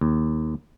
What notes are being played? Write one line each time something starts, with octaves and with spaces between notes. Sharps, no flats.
D#2